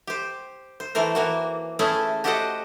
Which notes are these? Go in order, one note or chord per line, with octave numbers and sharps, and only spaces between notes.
G4 C5
C5
E3 A3 A#4 C5
E3 A#3 F#4
A3 C#4 E4 G#4
F#4 G4 A4 C5 D#5 F#5